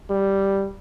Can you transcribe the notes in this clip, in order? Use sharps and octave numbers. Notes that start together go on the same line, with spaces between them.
G3